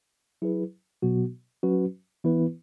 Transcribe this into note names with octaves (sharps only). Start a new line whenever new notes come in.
F#3 E4 G#4 B4
B2 F#3 B3 F#4
F#3 C#4 F#4 B4
E3 B3 E4 B4